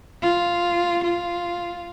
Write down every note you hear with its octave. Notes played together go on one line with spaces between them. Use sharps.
F4
F4